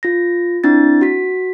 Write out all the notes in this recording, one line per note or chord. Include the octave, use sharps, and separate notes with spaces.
F4 A#6
C4 D4 E4 A6
F#4 B6